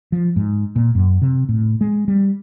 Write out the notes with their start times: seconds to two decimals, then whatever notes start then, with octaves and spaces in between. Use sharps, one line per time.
0.12 F3
0.36 G#2
0.76 A#2
0.95 F#2
1.22 C3
1.49 A2
1.81 G#3
2.08 G3